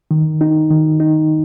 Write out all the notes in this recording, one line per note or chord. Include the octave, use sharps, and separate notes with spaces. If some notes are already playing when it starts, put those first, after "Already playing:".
D#3
D#4
D#3
D#4